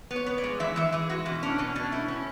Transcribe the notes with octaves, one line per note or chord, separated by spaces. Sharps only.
B3
C#5
B3
D5
G#3
E3 E5
E3 E5
E3 G#4
G#3 F#4
B2 E4
C#4 D4
B2 C#4
B2 D4
A3 E4
C#4